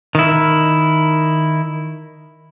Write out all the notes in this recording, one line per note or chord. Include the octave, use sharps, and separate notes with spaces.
D#3 E4